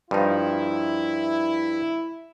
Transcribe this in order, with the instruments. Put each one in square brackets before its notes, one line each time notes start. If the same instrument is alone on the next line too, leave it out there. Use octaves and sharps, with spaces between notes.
[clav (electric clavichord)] G2 F3 D#4 [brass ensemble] E4